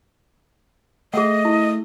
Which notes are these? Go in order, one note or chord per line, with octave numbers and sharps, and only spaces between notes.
A3 G#4 D#5 F#5
E4